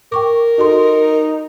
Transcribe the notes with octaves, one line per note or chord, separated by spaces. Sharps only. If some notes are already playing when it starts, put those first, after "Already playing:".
A#4 G5 C#6 D6
D#4 F#4 A4 C6